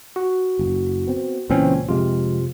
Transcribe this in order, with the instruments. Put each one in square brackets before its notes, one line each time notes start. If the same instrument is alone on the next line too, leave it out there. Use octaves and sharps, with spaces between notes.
[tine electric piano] F#4
[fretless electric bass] F#1
B3 C4
[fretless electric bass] C#2 A#2 [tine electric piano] E3 C4 C#4
[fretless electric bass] F2 G#3 [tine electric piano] C3 F4